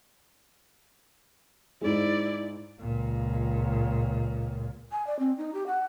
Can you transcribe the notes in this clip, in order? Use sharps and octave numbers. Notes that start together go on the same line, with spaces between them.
G#2 G#3 E4 D5
C#2 A#2
G#5
D5
C4
D#4
G4
F#5